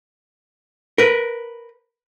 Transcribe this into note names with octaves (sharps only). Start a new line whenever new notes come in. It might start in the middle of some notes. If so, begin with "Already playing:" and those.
A#4 B4